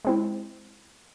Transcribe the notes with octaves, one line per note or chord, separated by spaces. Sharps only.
G#3 C4 E4